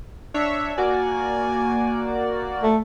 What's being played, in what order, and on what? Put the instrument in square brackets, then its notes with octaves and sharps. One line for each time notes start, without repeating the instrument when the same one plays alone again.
[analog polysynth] D4 C#5 E5
[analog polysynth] A#3 F#4 D5 [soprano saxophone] G#5
[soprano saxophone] A3